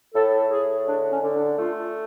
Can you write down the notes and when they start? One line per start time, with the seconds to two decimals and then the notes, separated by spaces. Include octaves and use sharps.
0.14 A2 A4
0.50 A2 G#4
0.86 D3 D4
1.10 C#4
1.22 D3
1.34 D4
1.58 A3 F4